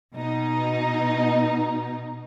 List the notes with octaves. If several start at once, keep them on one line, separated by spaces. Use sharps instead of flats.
B2 D#4